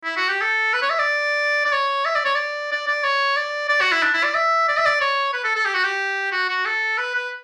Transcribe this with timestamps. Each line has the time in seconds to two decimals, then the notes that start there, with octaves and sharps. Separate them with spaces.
0.05 E4
0.17 F#4
0.29 G4
0.41 A4
0.74 B4
0.82 C#5
0.90 E5
0.99 D5
1.66 D5
1.73 C#5
2.06 E5
2.15 D5
2.25 C#5
2.35 D5
2.72 D5
2.87 D5
3.04 C#5
3.37 D5
3.69 D5
3.81 F#4
3.92 E4
4.03 D4
4.14 E4
4.24 D5
4.35 E5
4.68 D5
4.77 E5
4.85 D5
5.01 C#5
5.34 B4
5.44 A4
5.56 A4
5.65 G4
5.74 F#4
5.84 G4
6.32 F#4
6.49 F#4
6.66 A4
6.98 B4
7.15 B4